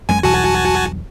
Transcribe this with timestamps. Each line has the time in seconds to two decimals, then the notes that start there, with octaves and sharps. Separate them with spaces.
0.09 F#2 G#3 G#5
0.23 B1 E2 G2 F#4 G#5 A5